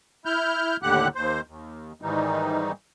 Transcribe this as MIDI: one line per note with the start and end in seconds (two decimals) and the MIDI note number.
0.25 0.77 64
0.25 0.77 89
0.25 0.77 91
0.83 1.08 39
0.83 1.08 45
0.83 1.08 50
0.83 1.08 67
0.83 1.08 78
0.83 1.08 90
1.15 1.41 39
1.15 1.41 72
1.47 1.92 39
2.02 2.72 44
2.02 2.72 51
2.02 2.72 52
2.02 2.72 55
2.02 2.72 63